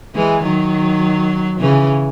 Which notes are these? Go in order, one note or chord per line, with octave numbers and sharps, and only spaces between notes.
E3 G#3
D#3 F#3
C#3 E3